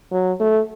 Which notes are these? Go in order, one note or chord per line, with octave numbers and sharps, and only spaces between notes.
F#3
A3